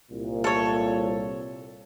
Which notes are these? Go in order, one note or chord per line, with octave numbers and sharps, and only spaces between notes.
C2 A#2
A4 C#5